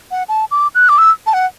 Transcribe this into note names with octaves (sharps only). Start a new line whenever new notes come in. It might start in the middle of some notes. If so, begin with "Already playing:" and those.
F#5
A5
D6
F#6
D6
E6
A5
F#5